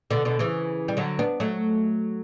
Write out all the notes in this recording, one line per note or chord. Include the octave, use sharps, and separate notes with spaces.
B2 D3
B2 D3
C#3 E3
G3
D3 F#3
B3 D4
F#3 A3